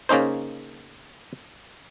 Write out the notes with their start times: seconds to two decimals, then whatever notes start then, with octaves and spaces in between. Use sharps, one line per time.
0.09 C#3 A#3 C#4 D#4 C5